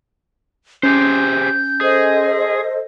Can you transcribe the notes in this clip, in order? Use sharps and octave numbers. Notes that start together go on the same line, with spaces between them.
C#4 G4 G#4 C5 G6
G#4 A4 C5 D#5